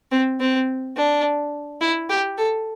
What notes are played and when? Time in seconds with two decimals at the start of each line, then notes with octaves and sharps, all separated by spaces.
0.11 C4
0.40 C4
0.97 D4
1.81 E4
2.09 G4
2.38 A4